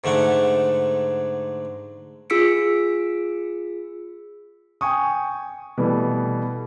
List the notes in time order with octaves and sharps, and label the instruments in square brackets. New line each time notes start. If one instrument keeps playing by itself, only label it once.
[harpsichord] G#2 D3 A3 F#5
[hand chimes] F4 G#4 E6 B6 C#7 D7
[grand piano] G5 G#5 C#6 D#6
B2 E3 G3 A3